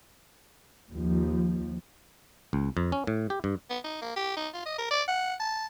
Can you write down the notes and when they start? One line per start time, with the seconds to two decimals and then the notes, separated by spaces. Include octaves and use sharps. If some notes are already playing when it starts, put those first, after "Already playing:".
0.92 D#2 F3
2.53 C#2
2.77 F2
2.92 C#4
3.07 A2
3.30 G4
3.44 G2
3.70 B3
3.84 D#4
4.02 A#3
4.16 G4
4.36 D#4
4.54 F4
4.66 D#5
4.78 A#4
4.91 D5
5.08 F#5
5.40 A5